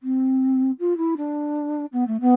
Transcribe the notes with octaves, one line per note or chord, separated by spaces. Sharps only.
C4
F4
E4
D4
B3
A3
B3